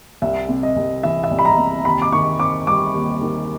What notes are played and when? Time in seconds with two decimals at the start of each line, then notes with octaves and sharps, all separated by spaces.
0.22 C2 E5
0.48 C3
0.63 D#5
0.76 C2
1.03 E3 E5
1.24 E5
1.31 C2
1.39 B5
1.45 A#5
1.58 C3
1.85 D#2 B5
2.02 D6
2.12 D#3 C#6
2.39 C4 D6
2.67 G3 D6
2.94 D#2
3.21 D#3